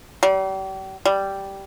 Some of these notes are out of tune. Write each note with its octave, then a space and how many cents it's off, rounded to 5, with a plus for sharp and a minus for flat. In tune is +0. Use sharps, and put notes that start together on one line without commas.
G3 -40
G3 -5